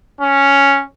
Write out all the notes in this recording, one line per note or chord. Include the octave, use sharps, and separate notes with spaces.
C#4